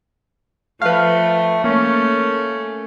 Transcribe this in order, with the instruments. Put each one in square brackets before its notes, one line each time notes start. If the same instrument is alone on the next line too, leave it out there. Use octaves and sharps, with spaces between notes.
[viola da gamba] F3 [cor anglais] A3 [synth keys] B4 F5
[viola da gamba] A3 [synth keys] A#3 [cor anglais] C#4